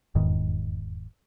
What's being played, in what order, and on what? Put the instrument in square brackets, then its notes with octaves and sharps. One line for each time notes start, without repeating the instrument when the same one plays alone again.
[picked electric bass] F1 E2 G#2 D#3